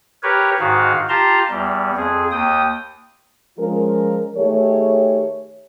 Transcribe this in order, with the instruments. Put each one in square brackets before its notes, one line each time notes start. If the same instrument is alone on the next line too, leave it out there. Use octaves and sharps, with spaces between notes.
[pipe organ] G4 A#4 B4 C#5
G#2 D#3 F#4 F5
F4 G4 A5 A#5 C6
E2 G3
F2 G#4
D#2 G5 D#6
[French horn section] F3 G#3 C#4 F4 A#4
D#3 A3 G4 G#4 C#5